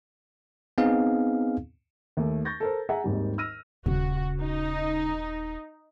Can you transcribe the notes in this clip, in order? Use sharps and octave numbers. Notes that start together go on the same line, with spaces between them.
B3 C4 D#4 G#4 F5
D#2 A3
C#6 G6 A6 A#6
A4 A#4 C5
G#4 E5 F#5 G#5 A#5
G#1 D#2 G#2 G3
E6 F6 A#6 D#7
D#1 C#3 F#4
D#4